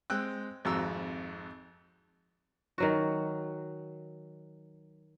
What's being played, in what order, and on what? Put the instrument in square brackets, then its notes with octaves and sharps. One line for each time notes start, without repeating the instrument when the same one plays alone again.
[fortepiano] G#3 C4 G5 E6 F#6
G#1 F2 F#4 A#5 E6
[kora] D#3 F#3 F#4